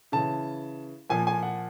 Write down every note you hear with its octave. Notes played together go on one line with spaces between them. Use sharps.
C#3 E3 A5
A#2 F3 G#5
G#5
F#5